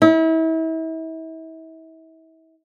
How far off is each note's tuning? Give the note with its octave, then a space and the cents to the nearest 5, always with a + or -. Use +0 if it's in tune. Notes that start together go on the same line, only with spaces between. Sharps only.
E4 -35